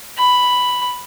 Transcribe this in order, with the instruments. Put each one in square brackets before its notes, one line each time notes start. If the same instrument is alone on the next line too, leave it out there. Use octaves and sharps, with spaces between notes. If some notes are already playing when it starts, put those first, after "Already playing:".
[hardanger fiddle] B5